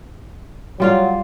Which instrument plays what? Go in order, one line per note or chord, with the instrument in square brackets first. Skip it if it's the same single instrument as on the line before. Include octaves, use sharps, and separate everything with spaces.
[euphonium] F#3 [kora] G3 F4 F5